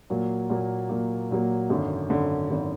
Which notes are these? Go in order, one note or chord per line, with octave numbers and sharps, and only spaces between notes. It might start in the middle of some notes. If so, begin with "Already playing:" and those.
A#2 F#3 A#3
A#2 F#3 A#3
A#2 F#3 A#3
A#2 F#3 A#3
G#1 F#2 D3
G#1 F#2 D3
G#1 D3